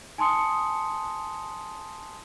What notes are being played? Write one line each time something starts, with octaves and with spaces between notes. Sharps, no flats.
G#5 A5 C6 D#6 C#7